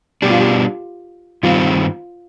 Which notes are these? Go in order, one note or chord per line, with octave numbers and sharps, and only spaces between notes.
B2 G3 D4 G4
F4
G4
G2 D#3 G3 C4 F4